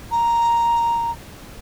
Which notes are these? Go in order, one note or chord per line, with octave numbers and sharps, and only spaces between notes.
A#5